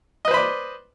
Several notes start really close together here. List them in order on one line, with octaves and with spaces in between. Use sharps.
D#5 B4 C5 B5 D5